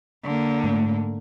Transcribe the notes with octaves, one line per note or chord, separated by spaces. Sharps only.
D3 A#3
G#2 A3